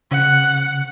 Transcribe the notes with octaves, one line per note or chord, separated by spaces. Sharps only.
C#3 F#5